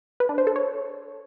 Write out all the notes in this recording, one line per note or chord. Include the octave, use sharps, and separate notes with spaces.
B4
D4
C5
A4
C#5